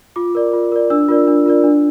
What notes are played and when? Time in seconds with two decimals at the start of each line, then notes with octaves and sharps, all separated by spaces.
0.16 F4 D6
0.35 A#4 D5
0.53 F4
0.72 A#4 D5
0.90 D4 E6
1.08 F4 A#4 D5
1.28 D4
1.46 F4 A#4 D5
1.64 D4